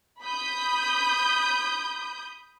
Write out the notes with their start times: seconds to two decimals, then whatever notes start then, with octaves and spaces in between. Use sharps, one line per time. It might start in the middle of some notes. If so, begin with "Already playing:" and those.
0.23 B5 D#6 G6